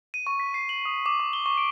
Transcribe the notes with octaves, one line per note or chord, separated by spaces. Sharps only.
D#7
C#6
B6
C7
F#7
D#6
D6
C#6
G7
C#6
D7